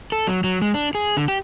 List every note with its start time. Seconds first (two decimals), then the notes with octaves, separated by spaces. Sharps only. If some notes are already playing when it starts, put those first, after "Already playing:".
0.12 A4
0.27 F#3
0.44 F#3
0.62 G#3
0.74 D4
0.95 G#4
1.17 D3
1.28 G4